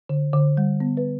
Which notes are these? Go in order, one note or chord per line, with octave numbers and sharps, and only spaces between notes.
D3
D3
G3
B3
B4